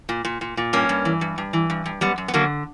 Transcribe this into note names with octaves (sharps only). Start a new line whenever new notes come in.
A#2
A#2
A#2
A#2
G2 A#3 C#4
G2
E3
G2
G2
E3
G2
G2
F#2 G3 B3
F#2
B3
D3 F#3 A#3